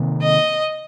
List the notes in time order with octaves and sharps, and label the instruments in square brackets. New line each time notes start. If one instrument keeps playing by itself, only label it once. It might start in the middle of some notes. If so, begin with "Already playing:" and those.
Already playing: [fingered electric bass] C3 D#3 A#3
[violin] D#5